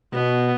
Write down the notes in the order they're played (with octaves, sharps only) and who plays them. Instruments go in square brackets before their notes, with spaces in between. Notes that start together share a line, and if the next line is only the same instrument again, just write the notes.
[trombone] B2 [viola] B3